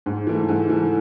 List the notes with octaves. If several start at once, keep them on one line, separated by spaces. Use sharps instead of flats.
G#2
E3 A3
G#2
E3 A3